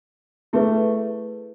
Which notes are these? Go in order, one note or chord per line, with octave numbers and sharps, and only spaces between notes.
A3 E4 G#4 B4